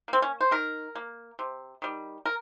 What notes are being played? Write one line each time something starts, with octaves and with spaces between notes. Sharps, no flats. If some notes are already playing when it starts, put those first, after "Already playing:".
A#3 C4
C#4
C5
D#3 A#4
A#3
C3
D#3 G3
A#4